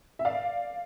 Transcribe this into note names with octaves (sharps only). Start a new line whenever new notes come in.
E5
D5 F5